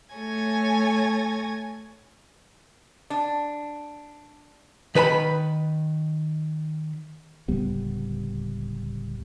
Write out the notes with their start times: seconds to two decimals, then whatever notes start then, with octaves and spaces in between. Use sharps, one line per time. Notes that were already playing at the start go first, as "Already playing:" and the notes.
0.14 A3 A4 C#5 G#5 G#6 A#6
3.10 D4
4.95 D#3 B4 G#5 B5
7.48 D1 C#2 G3 B3